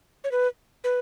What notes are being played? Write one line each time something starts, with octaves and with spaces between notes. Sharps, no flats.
C#5
B4
B4